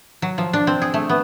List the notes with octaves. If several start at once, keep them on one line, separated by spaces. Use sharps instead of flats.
F#3
F3
D4
C4
G#4
A3
B3